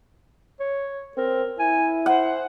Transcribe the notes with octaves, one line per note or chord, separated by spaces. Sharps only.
C#5
C4 A#4
E4 G#5
C5 F#5